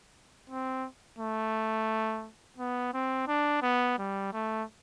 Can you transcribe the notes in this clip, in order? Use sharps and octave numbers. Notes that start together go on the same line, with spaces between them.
C4
A3
B3
C4
D4
B3
G3
A3